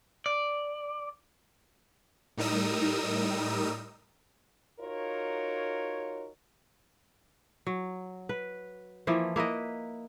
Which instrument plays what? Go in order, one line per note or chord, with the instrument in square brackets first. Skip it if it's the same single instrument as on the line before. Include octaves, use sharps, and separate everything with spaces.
[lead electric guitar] D5
[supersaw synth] A2 G3 D#4 A#4 D#6 E6
[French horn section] D#4 F4 F#4 A#4 C#5
[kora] F#3
B4
E3 F3 A#3 E4
A#3 E4 B4 D#5